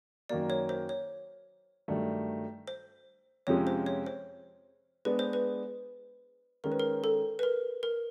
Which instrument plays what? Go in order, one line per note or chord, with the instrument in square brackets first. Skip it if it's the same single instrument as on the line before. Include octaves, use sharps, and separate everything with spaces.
[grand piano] F#2 D#3 F#3 A#3 [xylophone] D5
[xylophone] C#5
C5
C#5
[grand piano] G2 D#3 F#3 A3 D4
[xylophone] C5
[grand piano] F2 C3 F3 G#3 C#4 [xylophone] C#5
[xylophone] C5
C#5
C5
[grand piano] G#3 B3 D4 [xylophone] B4
[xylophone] C5
B4
[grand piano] D#3 G#3 C#4 [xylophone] A#4
[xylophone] B4
A#4
A4
B4
A#4
A#4